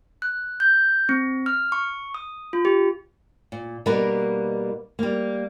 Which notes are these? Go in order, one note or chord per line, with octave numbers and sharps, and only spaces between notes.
F#6
G6
C4
F6
C#6
D#6
F4
G4
A#2
B2 G3 A#3 D#4 A#4 B4
G3 A#3